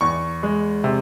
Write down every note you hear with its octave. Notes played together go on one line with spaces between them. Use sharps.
E2 C#6
G#3
C3